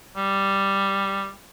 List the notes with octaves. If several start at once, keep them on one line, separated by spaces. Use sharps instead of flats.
G3